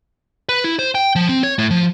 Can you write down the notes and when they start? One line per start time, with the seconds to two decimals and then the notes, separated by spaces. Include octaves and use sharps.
0.49 B4
0.64 E4
0.79 C5
0.95 G5
1.16 F3
1.29 C4
1.43 C#5
1.58 A2
1.71 F3